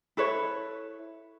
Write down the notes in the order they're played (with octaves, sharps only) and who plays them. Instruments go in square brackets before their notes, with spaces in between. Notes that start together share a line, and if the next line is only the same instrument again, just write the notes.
[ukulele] E4 A4 B4 C#5